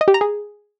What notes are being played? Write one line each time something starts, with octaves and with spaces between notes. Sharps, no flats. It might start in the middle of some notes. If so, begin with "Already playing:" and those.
D#5
G4
A#5
G#4